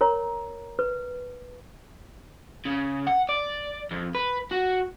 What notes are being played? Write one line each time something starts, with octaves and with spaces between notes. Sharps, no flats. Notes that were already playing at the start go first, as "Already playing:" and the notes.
A#4 C#5 A#5
B4
C#3
F#5
D5
F2
B4
F#4